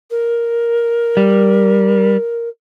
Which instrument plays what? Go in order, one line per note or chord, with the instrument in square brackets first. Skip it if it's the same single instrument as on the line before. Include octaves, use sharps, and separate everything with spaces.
[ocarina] A#4
[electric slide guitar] G3